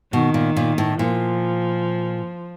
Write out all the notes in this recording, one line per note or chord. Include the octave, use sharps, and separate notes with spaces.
B2 D#3
A#2
A#2
A2
A#2 F3